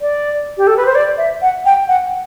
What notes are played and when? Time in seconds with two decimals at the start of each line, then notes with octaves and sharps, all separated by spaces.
0.01 D5
0.57 G4
0.67 A4
0.77 B4
0.86 C5
0.95 D5
1.18 E5
1.42 F#5
1.65 G5
1.88 F#5